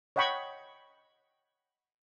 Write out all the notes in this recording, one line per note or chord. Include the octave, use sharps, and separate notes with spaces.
C#5 D#5 F#5 G5 B5 C#6